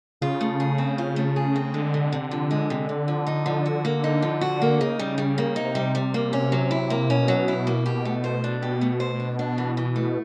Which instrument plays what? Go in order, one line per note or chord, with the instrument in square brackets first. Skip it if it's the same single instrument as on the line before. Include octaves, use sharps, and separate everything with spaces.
[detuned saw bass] C#3 [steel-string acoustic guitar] F4
[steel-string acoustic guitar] A3
G#4
C4
F4
A3
G#4
C4
[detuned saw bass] D3 [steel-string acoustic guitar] G#3
[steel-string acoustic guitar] C3
C3
F3
G#3
C3
C3
F3
D#4
F3
F#4
A#3
D#4
F3
F#4
A#3
[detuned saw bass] C#3 [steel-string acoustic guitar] D#4
[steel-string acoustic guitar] G3
G3
A#3
[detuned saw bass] C3 [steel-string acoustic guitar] D#4
[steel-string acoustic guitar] G3
G3
A#3
C#4
F#3
E4
A#3
[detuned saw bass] B2 [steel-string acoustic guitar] C#4
[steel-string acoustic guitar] F#3
E4
A#3
G4
A3
C5
D4
G4
A3
C5
D4
D4
E3
E3
A3